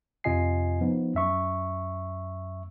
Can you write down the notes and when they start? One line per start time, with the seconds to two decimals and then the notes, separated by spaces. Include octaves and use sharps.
0.24 F2 C3 F4 D#5 G#5 C7
0.81 F3 B3 D#4
1.15 F#2 E5 C#6